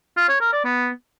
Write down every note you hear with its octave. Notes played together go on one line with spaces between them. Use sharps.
F4
C#5
A#4
D5
B3